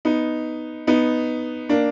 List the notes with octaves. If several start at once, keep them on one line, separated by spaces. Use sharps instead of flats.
B3 D#4
B3 D#4
A#3 D4